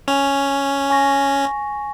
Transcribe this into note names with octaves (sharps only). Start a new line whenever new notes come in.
C#4 G#5 F7
G#5 C#6 A#6